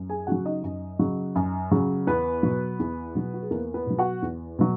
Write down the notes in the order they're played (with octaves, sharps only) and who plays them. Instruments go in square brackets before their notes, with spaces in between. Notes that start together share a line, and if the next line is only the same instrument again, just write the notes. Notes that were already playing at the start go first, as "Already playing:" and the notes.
Already playing: [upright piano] F#2
G#4 G#5
C#3 F#3 F#4 F#5
D#4 D#5
F#2
C#3 F#3
F#2
C#3 F#3
E2 B3 B4
B2 F#3
E2
B2 F#3
F#4
G#4
E2 A#3 A#4
B3 B4
B2 F#3
F#4 F#5
E2
B2 F#3